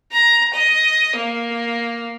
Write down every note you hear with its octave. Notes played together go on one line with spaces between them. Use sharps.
A#5
D#5
A#3